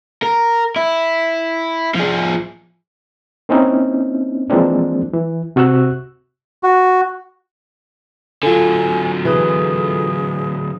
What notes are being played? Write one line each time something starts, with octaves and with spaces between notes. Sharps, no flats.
A#4
E4
F3 G#4
A#3 C4 C#4 D#4 E4
E3 F3 G#3 A#3 C4 D4
E3
C3 F#4 C#6 E6 F#6
F#4
D3 F#3 F4 A4 G#5
E3 G#4